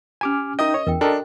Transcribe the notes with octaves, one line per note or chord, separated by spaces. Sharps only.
C#4 G4 G#5 A#5 D6 F6
D#4 A#4 D#5 E5 G5 D#6
C#5
E2 A#4 G5
D4 F#4 A4 A#4 D#5 G5